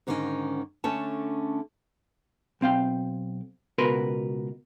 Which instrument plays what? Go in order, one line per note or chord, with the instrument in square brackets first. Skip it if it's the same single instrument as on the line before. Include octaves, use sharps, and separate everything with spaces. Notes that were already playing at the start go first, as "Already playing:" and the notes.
[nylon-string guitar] G#2 D3 D#3 F#3 C#4 D#5
D3 A3 C#4 A5
[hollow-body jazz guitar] B1 C4 F5 G5
C#2 B2 F#4 A#4 B4 C6